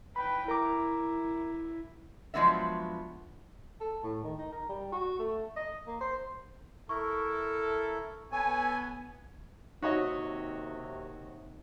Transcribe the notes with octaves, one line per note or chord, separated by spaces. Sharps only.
B4 G5 B5
E4 A#4 A#5 D6
F3 F#3 G#3 B3 D4 E5
A4
A2
D#3
D#4
A#4
G3
F#4
A3
D#5
A#3
C5
E4 A4 A#4 C#6
B3 A4 C#5 G#5
D#2 C3 D#4 F#4 C#5 D#5 E5